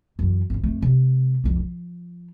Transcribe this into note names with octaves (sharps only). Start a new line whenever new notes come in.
F#2 E3
G#1 D3
F2 A3
C3 G#3
C2 F2
F3